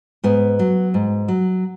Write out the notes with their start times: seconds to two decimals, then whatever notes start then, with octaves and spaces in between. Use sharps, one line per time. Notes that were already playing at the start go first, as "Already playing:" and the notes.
0.24 G#2 B3
0.59 F#3
0.94 G#2
1.28 F#3